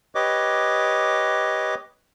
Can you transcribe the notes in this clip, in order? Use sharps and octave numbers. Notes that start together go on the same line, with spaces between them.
G4 B4 C#5 D#5 D6